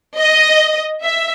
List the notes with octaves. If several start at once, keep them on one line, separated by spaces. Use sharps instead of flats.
D#5
E5